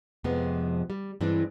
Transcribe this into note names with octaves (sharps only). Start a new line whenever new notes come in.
F2 C3 F3 G#3 B3
G3
G2 E3 G#3 C4 D4